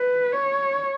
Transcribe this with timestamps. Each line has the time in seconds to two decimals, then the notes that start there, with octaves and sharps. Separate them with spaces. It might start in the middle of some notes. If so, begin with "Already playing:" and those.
Already playing: B4
0.32 C#5